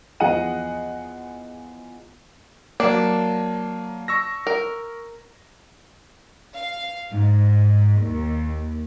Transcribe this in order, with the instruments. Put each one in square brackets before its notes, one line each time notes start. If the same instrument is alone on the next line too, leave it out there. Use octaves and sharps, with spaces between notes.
[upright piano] E2 F3 G#4 D#5 F#5 D#7
[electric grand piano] F#3 A#3 [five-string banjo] D4
[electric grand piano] C#6 E6 A#6
[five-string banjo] A#4
[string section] F5
G#2
D#2